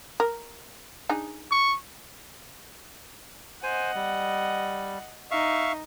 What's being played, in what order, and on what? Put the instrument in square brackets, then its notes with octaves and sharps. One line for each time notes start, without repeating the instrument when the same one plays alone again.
[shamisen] A#4
D4 D#4 G#4
[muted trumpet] C#6
[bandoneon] C5 G#5 [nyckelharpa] D#5 F#5
[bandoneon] G3
[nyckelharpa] D#4 [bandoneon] E5 F5 C#6